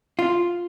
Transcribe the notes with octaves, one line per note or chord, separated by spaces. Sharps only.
F4